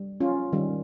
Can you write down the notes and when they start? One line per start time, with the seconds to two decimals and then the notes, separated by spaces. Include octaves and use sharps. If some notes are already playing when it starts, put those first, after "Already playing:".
Already playing: G3
0.21 C#4 F4
0.52 D#3 G3 C#4